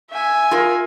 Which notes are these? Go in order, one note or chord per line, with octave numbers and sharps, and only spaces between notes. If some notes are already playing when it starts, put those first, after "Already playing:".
E5 G#5
F4 G#4 A#4